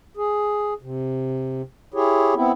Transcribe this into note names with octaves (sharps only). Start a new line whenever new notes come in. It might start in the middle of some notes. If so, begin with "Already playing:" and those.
G#4
C3
E4 G4 G#4 C#5
B3 C4 E4